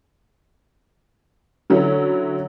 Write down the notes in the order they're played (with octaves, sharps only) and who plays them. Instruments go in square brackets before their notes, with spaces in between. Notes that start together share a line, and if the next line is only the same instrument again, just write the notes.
[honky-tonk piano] D3 F#3 C#4 E4